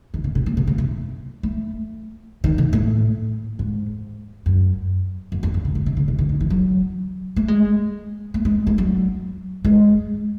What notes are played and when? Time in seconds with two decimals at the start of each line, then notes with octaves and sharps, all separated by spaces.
0.14 D#3
0.24 C#3
0.35 C3
0.46 A2
0.57 C3
0.67 C3
0.78 C3
1.43 A3
2.44 D#3
2.58 C3
2.73 A2
3.59 G#2
4.46 F#2
5.32 F#2
5.43 E2
5.54 F#2
5.65 C#3
5.75 C#3
5.86 C3
5.97 C#3
6.08 C3
6.19 C#3
6.29 D#3
6.41 E3
6.50 F#3
7.36 A3
7.48 G#3
8.34 A3
8.45 G#3
8.67 G#3
8.78 F#3
9.65 G#3